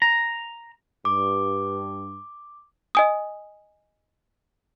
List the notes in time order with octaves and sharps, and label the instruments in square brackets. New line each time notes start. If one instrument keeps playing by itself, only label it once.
[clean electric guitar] A#5
[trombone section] G2 [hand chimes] D6
[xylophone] D#5 G#5 D#6